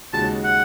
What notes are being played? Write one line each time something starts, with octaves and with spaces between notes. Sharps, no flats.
D#2 C#3 G#3 D#4 F#4 A5
F#5